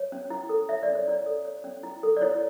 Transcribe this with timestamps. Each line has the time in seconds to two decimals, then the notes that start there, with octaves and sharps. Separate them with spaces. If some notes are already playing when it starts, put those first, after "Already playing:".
Already playing: C#5
0.12 C#4
0.30 E4
0.49 A4
0.69 C#5 E5
0.83 D5
0.88 C#4
0.95 C#5
1.08 E4 D5
1.26 A4
1.45 C#5
1.64 C#4
1.83 E4
2.03 A4
2.17 D5
2.21 E4 C#5